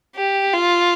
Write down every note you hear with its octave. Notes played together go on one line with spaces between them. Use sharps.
G4
F4